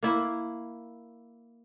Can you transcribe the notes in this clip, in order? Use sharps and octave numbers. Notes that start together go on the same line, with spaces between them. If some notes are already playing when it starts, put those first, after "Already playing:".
A#3 E4